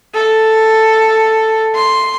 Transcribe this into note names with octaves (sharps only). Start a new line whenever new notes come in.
A4
C6